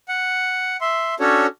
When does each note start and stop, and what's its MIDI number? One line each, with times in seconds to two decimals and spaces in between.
0.08 0.77 78
0.81 1.15 76
0.81 1.15 84
1.20 1.47 61
1.20 1.47 62
1.20 1.47 66
1.20 1.47 69
1.20 1.47 73